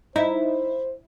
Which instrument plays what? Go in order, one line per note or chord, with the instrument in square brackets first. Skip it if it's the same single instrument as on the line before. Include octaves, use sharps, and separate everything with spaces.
[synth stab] D#4 [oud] E4 [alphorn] C5